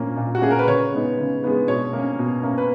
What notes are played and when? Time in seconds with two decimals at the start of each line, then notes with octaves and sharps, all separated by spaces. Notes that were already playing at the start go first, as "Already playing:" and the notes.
Already playing: A#2 A#3 C#4
0.16 A#2
0.35 F#4
0.42 A#3 C#4 G#4
0.51 A#4
0.59 B4
0.67 C#3 C#5
0.92 G#3 B3 D#4
1.18 C#3
1.43 G#3 B3 D#4
1.68 B2 C#5
1.93 A#3 C#4
2.19 B2
2.43 A#3 C#4
2.58 B4